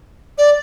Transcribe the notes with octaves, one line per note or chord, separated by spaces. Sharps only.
D5